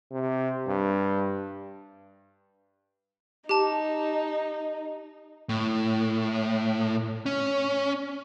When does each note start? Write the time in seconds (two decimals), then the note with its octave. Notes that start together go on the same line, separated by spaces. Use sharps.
0.11 C3
0.67 G2
3.49 D#4 G4 A5
5.49 A2
7.26 C#4